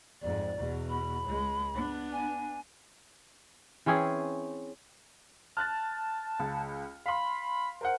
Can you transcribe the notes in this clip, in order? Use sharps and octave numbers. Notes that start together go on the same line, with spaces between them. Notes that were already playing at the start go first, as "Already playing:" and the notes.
F2 G#2 D5
E2 B2
B5
C#2 G#3
B3 D4
G#5
E3 C4 C#4 G#4
A5 F6 F#6 A6
C#2
F5 B5 C6
A#4 C5 F#5